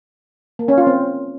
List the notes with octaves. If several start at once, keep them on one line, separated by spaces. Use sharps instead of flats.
A#3
C#4
F4
C4